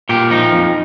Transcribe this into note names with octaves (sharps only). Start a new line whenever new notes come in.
A#2 G4
F3 D#4
F2